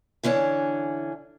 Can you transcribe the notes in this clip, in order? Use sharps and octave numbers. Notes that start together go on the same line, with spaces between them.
D3 E3 C#4 D4